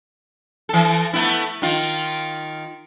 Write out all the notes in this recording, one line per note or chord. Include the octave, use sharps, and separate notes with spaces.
E3 A4
A3 B3 E4
D#3 F4